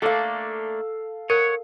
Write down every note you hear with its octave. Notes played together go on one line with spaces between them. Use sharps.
A3 A#3 D4 A4 F5
A#4 C#5 F#5